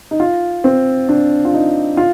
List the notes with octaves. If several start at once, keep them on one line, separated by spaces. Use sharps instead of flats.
D#4
F4
C4
D4
F4
D#4
F4